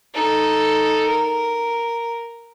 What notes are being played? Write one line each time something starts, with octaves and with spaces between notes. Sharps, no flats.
D#4 A4
A#4